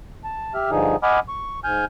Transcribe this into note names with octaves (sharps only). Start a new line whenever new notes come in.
A5
G4 E5 F6
G2 D3 F3 D#4 G#4
D#5 F#5 G#5 B5 D6 F6
C#6
G#2 G#5 F6 G6